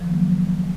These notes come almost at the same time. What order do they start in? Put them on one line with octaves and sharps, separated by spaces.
F3 D#3 A#3 F#3